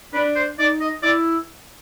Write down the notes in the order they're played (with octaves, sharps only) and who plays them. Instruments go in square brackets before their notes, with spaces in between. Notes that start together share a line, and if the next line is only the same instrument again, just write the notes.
[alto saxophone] D4 [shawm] B4
[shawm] C5
[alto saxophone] D#4 [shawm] D5
[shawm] D#5
[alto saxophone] E4 [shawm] D5